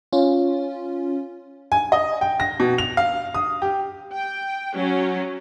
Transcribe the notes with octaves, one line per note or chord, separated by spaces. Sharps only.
C#4 F4
G#5
D#5
G5
A#6
B2
F7
F5
D#6
G4
G5
F#3 C#4